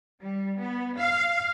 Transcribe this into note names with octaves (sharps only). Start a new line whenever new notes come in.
G3
B3
F5